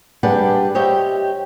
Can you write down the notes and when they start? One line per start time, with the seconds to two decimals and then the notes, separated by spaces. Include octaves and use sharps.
0.23 G3 D4 G4 G#4 B4 F#5
0.75 G4 C5 C#5 D#5 E5 G5